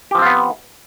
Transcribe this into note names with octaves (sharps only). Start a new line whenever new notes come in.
F3 B3 C4 F4 G4